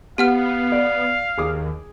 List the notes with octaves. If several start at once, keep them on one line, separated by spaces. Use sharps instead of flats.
B3 G4 F5 F#5 F6
D5
D#2 G#4 D6 D#6